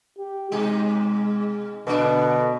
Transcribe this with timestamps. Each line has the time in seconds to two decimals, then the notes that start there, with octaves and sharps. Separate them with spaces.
0.18 G4
0.52 B2 G#3 D#4 G#4
1.87 B2 D3 A3 B3 D4